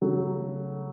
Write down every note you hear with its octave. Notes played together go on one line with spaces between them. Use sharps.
C#3 F#3 A3